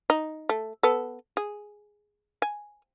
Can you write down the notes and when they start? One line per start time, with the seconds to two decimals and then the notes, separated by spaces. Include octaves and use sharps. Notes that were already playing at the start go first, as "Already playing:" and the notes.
0.10 D#4
0.49 A3
0.83 B3 A4
1.37 G#4
2.42 G#5